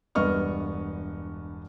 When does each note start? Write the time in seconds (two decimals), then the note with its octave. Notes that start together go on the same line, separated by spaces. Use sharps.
0.15 E1 G2 B3 D#5 C#6 F6